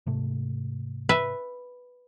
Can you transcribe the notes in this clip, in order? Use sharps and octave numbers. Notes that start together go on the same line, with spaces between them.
G#2 C3 A3
B4 E5